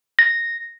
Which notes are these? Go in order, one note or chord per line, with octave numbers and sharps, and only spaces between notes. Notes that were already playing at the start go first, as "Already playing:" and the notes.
A#6